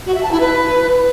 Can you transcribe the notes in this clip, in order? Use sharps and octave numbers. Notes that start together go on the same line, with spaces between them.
F#4
E5
A5
E4
B4